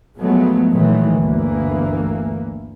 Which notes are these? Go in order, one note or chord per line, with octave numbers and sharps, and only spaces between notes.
F3 F#3 G#3 A3 B3
A#2 D#3 E3 F#3 G#3 A3
G1 D2 E3 A#3